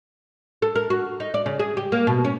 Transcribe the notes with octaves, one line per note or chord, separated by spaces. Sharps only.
A4
A#4
F#4
D#4
D5
C#3
G#4
G4
A#3
B2
C#4